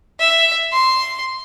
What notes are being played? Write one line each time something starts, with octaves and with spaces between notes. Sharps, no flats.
E5
C6